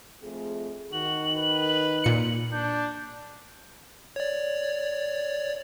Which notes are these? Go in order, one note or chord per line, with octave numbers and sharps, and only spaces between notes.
F2 A3 G#4
D#3 F#4 F#7
B4
A#2 C#7
D4 G6
C#5 D5